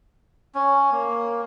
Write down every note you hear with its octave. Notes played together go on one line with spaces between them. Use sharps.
C#4
A#3